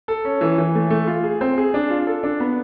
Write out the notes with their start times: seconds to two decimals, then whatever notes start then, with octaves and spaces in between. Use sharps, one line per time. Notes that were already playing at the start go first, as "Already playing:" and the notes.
0.08 A4
0.25 C#4
0.41 E3
0.58 E3
0.75 A3
0.90 A3
1.07 F4
1.23 G#4
1.41 C4
1.58 G#4
1.74 D4
1.90 F4
2.07 A4
2.23 D4
2.40 B3